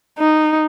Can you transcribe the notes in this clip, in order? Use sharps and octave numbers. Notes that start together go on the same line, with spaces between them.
D#4